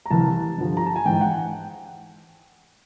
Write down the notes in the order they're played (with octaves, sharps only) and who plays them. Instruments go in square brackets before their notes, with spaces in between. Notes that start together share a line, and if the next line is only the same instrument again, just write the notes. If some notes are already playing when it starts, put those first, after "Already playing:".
[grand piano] A#5
C2 C3 E3 A5
G2 D3 F3
A#5
A5
G#5
G#2 E3 G5
F#5